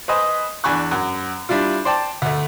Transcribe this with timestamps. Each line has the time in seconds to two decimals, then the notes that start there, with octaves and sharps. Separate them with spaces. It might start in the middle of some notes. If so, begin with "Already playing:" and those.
0.08 B4 C5 D#5 G#5
0.64 E2 D4 G#5 B5 C#6 F#6
0.91 F#2
1.49 G3 D4 E4 F4
1.85 C5 D5 G5 A5
2.22 D2 A3